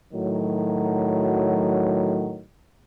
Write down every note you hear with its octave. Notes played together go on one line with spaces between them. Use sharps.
A2 D#3 F#3